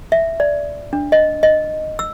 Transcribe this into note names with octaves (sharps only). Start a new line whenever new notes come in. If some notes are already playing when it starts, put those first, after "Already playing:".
E5
D5
D4
D#5
D#5
E6